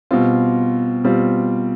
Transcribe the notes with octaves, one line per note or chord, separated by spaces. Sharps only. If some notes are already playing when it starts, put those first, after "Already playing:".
B2 G3 C4 F4
B2 G3 C4 F4